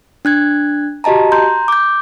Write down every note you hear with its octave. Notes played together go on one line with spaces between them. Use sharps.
D4 F#6 G#6
F#4 G4 D#5 A5 A#5
A#5 C6 G6
D6 G6